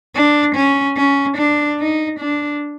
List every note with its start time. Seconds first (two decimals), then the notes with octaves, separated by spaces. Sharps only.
0.15 D4
0.56 C#4
0.97 C#4
1.38 D4
1.79 D#4
2.20 D4